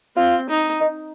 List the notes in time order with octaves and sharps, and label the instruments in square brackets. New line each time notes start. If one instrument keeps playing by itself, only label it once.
[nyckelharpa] C4 [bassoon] F4
[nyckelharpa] D#4
[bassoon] D#4